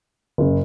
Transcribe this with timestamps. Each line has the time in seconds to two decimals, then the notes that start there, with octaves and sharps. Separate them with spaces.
0.38 F#1 C#3